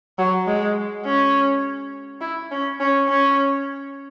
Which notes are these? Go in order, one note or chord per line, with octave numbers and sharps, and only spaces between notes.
F#3
G#3
C#4
E4
C#4
C#4
C#4